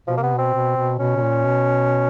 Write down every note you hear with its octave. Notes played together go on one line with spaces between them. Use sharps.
B2 F3
A#3
C3 B3
B2 C4
B2
B2
B2 C#4
B2
A#2
B2